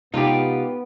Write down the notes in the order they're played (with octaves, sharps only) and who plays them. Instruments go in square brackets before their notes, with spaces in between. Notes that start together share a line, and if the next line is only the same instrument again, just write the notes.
[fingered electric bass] C3 G#3 [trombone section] B3 [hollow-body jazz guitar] D#4 A4 D5 [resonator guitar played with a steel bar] F4 G4